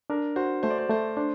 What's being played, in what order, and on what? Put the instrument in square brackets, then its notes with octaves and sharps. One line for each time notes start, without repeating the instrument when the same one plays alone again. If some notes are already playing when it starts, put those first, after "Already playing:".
[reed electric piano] D4 [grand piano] A#4
[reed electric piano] F#4 [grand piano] C5
[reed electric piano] A3 [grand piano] C5
[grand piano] D5
C5
[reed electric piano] A3 [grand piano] C5
[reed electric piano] D4 [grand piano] C5